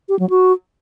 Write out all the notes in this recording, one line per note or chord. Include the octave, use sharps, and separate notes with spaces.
G4
F#3
F#4